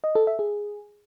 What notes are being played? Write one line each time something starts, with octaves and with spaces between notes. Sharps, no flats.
D#5
A4
E5
G#4